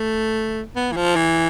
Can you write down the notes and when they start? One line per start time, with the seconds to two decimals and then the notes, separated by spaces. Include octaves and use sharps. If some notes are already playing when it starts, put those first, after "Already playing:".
Already playing: A3
0.76 B3
0.92 E3
0.96 F3
1.16 E3